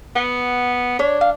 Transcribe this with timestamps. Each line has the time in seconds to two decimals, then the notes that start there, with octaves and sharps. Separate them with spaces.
0.16 B3 F#5
0.99 D4 C#5
1.21 F5